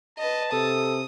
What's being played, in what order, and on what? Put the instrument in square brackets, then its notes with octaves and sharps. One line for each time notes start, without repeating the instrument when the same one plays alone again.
[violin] B4 D#5 [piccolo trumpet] A5
[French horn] C3 [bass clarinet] A4 [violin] D#6